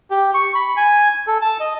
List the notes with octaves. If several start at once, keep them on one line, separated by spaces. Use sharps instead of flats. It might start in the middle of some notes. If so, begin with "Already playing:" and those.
G4
C#6
B5
G#5
A4
A5
D#5